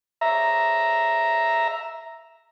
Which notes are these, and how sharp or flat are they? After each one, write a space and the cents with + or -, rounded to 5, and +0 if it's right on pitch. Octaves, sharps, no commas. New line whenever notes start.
E5 +0 A#5 +0